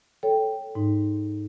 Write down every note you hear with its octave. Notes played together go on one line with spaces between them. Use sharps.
A4 C#5 G5
G#2 D#4